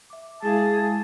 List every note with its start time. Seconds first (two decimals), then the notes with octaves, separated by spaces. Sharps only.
0.10 E5 D6
0.43 G#3 E4 G#4 F5 A5